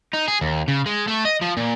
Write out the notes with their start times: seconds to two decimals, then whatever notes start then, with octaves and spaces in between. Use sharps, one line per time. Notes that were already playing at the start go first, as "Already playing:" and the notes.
0.13 D#4
0.28 G#4
0.41 D#2
0.68 C#3
0.86 G#3
1.08 A3
1.25 D#5
1.42 F3
1.57 A#2